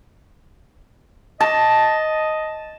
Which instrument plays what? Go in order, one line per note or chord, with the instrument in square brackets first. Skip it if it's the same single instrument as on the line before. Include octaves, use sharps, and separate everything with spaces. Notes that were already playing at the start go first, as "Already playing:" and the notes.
[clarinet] D#5 [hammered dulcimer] A5